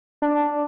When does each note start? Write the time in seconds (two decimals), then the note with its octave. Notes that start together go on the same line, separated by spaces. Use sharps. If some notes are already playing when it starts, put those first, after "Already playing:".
0.22 D4